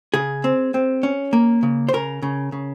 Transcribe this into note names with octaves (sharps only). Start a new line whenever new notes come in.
C#3 G#4
C4
C4
C#4
A#3
C#3
C5
C#3 A#4
C#3
C#3